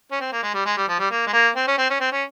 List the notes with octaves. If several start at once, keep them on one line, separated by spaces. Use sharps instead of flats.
C#4
C4
A#3
G#3
G3
G#3
G3
F3
G3
A#3
G#3
A#3
C4
C#4
C4
C#4
C4
C#4